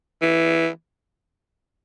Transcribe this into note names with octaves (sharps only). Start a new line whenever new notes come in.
E3